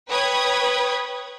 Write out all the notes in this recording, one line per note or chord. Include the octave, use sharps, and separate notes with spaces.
B4 C#5 G5 B5 D#6 G#6